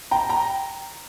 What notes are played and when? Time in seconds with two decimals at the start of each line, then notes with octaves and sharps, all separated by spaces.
0.11 G5 A#5
0.29 G5 A#5